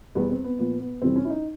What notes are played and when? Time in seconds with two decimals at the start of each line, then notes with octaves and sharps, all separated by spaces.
0.15 E2 B2 G3 B3
0.30 C4
0.44 B3
0.59 A#2 F3 B3
0.80 B3
1.02 F2 C3 E3 G3 C4
1.16 C#4
1.25 E4
1.30 D#4